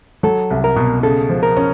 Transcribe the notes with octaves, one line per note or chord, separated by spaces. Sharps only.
F#3 A4
C2
A#4
B2
C#3 A4
F3
A#4
C#4